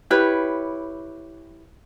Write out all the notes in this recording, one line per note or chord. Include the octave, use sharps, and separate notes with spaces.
E4 G4 B4 C#5